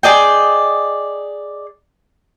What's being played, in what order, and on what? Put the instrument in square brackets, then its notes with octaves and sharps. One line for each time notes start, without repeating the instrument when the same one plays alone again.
[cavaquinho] G#4 D5 D#5 G5